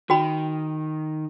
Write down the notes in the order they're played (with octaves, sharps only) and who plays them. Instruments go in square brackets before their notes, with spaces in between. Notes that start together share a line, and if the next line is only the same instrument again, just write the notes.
[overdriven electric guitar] D#3 [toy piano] F#4 G5 B5